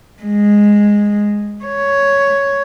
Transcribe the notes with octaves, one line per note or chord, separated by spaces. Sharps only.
G#3
C#5